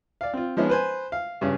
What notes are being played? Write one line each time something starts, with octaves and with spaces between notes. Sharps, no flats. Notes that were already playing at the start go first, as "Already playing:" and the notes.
D5 F5
C4 F4
F3 G#3 B3 C#4 D#4
B4 C5 G#5
F5
G2 C#3 C#4